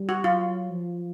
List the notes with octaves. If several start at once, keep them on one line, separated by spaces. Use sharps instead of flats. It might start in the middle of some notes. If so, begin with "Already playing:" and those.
Already playing: G3
F#4
F#3 F4
F3